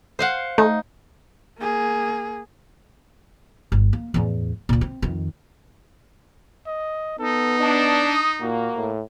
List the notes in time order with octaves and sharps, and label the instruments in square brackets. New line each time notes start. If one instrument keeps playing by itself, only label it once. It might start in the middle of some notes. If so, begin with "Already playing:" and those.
[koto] C5 F5 F#5
[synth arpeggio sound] A3 [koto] D#4
[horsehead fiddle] A#3 G#4
[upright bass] G1
A#3
E2 A2
D2 A#2
C4
F2 D#3
[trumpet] D#5
[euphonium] B3 [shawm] D#4 [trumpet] A4
[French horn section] D4 [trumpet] D#5
[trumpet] D#6
[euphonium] A#2 [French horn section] A#3 [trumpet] F#4
[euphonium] A2